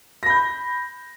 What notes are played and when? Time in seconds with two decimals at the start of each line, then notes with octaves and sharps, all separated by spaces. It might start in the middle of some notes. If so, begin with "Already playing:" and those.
0.23 A#6
0.26 B5
0.30 G6